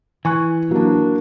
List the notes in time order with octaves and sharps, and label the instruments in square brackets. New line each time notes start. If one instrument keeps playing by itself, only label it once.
[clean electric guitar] E3 [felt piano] G#5 C#6 F#6
[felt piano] F#3 D4 [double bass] A#3